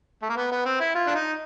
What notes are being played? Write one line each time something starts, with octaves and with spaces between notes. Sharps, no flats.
A3
A#3
B3
B3
C4
E4
F4
D4
D#4